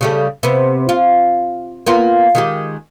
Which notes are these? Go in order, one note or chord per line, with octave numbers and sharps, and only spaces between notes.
C#3 G3 A3
C3 B3
F4
A#3 B3 F4
D#3 G#3 G4